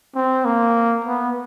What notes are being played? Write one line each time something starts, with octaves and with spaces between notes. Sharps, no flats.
C4
A#3
B3